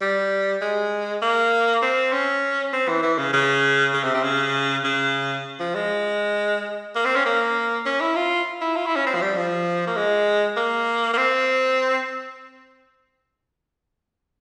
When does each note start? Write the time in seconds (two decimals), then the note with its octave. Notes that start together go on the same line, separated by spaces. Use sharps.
0.02 G3
0.62 G#3
1.22 A#3
1.82 C4
2.13 C#4
2.73 C4
2.88 E3
3.03 E3
3.18 C#3
3.33 C#3
3.94 C#3
4.04 C3
4.14 C3
4.24 C#3
4.84 C#3
5.60 F3
5.75 G#3
6.96 A#3
7.05 C4
7.16 C#4
7.26 A#3
7.86 C#4
8.01 E4
8.16 F4
8.61 E4
8.76 F4
8.86 E4
8.96 C#4
9.06 C4
9.15 F3
9.22 G3
9.37 F3
9.87 A#3
9.96 G#3
10.57 A#3
11.13 A#3
11.18 C4